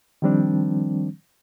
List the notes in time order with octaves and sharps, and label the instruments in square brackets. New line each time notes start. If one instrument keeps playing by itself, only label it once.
[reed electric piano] D#3 F3 G3 C4 D4